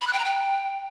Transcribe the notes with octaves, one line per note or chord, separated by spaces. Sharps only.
B5
F#6
G5
A#5
G5